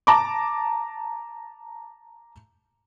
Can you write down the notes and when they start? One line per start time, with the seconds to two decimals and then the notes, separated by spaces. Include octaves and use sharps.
0.07 A5 A#5 D6